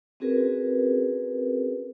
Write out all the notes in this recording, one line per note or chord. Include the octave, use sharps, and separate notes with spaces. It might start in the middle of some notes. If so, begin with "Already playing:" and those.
C4 C#4 F#4 G#4 A#4 B4